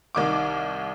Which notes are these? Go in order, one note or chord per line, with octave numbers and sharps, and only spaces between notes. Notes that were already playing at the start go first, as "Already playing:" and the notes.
C2 D#3 D6